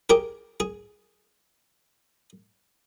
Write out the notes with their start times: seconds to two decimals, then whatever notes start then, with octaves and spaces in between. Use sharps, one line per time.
0.10 G4 G#4 A#4
0.60 G#4